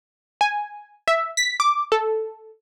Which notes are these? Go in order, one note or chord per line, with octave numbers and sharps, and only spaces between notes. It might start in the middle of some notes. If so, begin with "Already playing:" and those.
G#5
E5
B6
D6
A4